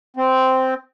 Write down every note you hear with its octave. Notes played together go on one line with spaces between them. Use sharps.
C4